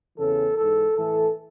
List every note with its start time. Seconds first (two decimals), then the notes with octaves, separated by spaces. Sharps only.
0.17 E2 C#3 E3 A4
0.55 G#2 E3 A4
0.95 A2 E3 A4